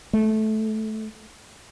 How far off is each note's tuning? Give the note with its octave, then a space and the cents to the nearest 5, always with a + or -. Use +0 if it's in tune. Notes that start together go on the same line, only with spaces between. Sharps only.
A3 -15